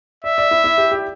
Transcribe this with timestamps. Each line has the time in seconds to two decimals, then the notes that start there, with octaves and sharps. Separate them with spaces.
0.24 D5 E5
0.38 D5
0.51 E4
0.64 E4
0.78 G4
0.92 G4